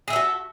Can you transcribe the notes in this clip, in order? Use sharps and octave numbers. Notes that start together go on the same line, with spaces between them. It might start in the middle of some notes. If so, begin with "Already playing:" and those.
F#4 G#4 A4 E5